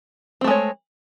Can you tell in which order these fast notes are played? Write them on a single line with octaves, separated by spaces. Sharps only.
C4 A3 G#3 C#5